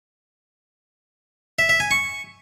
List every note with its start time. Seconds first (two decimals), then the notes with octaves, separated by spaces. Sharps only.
1.59 E5
1.69 E5
1.80 G#5
1.91 C#6